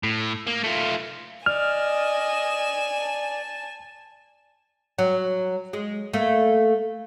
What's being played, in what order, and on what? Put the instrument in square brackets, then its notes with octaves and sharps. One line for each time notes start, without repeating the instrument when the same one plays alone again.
[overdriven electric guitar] A2
A#3
A3 F4
[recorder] D5 [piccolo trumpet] D#5 [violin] G#5 E7 [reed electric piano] F6
[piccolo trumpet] A5
[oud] F#3
G#3
A3 A#3